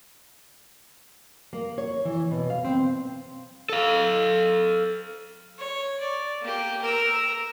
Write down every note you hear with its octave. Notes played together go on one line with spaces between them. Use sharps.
A#3
C#5
E3
B2
F5
C4
A4 F5
C#5
D5
A#3 G4
A#4 E6